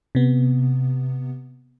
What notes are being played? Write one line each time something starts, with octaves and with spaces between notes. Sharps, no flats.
C3 B3